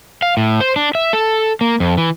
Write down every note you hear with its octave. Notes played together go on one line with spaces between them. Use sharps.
F5
A2
C5
D4
E5
A4
A#3
F2
E3